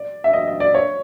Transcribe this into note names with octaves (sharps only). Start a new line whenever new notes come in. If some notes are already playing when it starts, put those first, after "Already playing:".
Already playing: D5
E5
D#5
D#5
D5
C#5